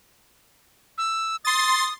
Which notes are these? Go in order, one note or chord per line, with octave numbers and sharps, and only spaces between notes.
E6
C6 D#6 A6